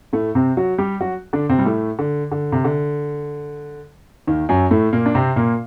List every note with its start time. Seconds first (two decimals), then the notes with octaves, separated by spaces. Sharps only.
0.13 A2 A3
0.35 C3 C4
0.57 F#3 F#4
0.78 G3 G4
1.00 F#3 F#4
1.33 D3 D4
1.49 C3 C4
1.59 G3
1.66 A2 A3
1.99 D3
2.32 D3
2.52 C3
2.64 D3
4.27 D#2 D#3
4.49 F#2 F#3
4.71 A2 A3
4.93 A#2 A#3
5.06 D4
5.15 C3 C4
5.36 A#2 A#3